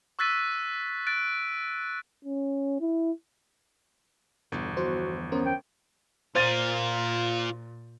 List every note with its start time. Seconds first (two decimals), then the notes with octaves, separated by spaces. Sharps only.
0.19 C#6 E6 F#6 A6 B6 D#7
1.07 F#6 A6 D7
2.25 C#4
2.80 E4
4.52 G1 E2 B2 D3
4.77 E2 F3 F#4 C5
5.32 B3 C#4 A#4 C5
5.46 G5
6.35 A#2 F4 A#4 C5 A6 D#7